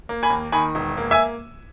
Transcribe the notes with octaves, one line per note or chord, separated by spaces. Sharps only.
A#3
G#5 B5
D#2
D#3 G#5 B5
E1
A#3
E5 G#5